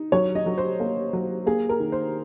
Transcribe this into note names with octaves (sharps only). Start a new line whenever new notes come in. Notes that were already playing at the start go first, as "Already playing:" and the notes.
Already playing: D#4
F#3 C#5
D#5
F#3
C5
A#3
F#3
A#3 G#4
A#4
D#3
C5